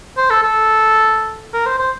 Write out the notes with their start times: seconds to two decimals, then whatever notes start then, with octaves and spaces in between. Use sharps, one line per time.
0.17 C5
0.30 A4
0.42 A4
1.53 A#4
1.66 C5
1.79 C5